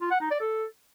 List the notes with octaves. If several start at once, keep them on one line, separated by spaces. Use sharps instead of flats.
F4
F#5
D#4
D5
A4